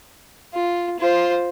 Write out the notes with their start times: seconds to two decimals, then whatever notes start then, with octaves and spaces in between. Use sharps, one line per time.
0.54 F4
0.99 F4 C5